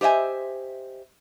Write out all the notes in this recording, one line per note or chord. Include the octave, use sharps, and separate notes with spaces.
G4 C5 D#5 E5 G#5